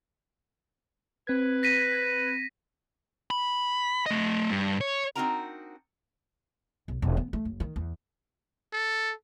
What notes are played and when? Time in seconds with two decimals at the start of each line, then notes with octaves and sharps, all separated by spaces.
1.27 C4 B4 G#6
1.63 A#6 B6 D#7
3.31 B5
4.06 A3 D#5
4.50 G2
4.81 C#5
5.15 C4 D4 D#4 F#4 A#4 A#5
6.88 B1
7.02 E1
7.17 B3
7.33 A3
7.45 F#1
7.60 D#3
7.76 E2
8.73 A4